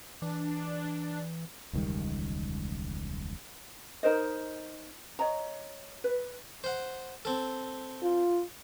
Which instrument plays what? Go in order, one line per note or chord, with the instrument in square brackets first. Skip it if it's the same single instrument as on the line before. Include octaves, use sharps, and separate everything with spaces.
[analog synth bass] E3 [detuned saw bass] D4
[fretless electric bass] E1 C#2 D#3 G3
[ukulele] D#4 A#4 C5 D#5
C#5 D#5 A#5
B4
[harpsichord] C5 F#5
C4 A4
[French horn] F4